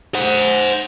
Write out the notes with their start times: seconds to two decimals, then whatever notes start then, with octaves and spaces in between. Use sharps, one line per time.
0.15 C5 F#5